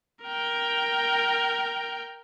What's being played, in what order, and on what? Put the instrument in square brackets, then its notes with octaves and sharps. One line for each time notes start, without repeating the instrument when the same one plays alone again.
[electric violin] A#4 G5